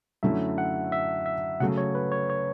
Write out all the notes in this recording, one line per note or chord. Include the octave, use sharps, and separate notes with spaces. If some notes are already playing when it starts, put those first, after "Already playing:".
F#2 D3 A3 C#4 E4 E5
F#5
E5
E5
C#3 F#3 A3 F#5
C#5
B4
C#5
C#5